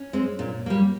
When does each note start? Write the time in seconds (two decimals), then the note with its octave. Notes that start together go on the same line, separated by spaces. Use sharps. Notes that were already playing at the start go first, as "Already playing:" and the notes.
Already playing: C#4
0.13 G#3 C4
0.39 A#2
0.66 G3 A#3